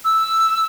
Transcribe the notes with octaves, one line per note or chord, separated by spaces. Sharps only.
E6